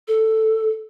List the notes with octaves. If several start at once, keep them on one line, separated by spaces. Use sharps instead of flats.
A4